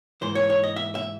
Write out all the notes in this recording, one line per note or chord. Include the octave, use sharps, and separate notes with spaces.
G#2 E3 C5
C#5
C#5
D#5
E5
E5